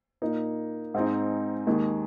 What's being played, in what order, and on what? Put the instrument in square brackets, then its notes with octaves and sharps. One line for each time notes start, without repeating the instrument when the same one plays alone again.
[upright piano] A#2 A#3 D#4
G#2 G#3 C4 D#4
D#2 D#3 G#3 D#4